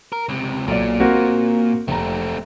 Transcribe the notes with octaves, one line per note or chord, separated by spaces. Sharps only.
A#4
C#2 C3
B1 A#2 D5
A#3 C4 F#4
F1 A3 C4 A#5